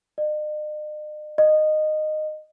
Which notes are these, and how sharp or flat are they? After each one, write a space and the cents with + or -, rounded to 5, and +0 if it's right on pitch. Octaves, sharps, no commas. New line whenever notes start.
D#5 -45
D#5 -15